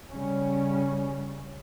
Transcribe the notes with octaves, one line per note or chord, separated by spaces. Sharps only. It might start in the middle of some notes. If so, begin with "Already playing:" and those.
C#3 G3 C#4